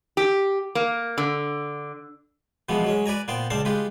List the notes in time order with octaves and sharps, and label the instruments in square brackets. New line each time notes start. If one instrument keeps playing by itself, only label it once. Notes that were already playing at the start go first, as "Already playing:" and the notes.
[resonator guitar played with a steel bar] G4
A#3
D3
[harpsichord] B2 E3 F3 G#3 B3
F#3 G#3 C#4
B4 D5 G#5 A#5
A#2 B3 C5 G5
C#2 C4 D4 F5 A5
G#3 F4 G4 B4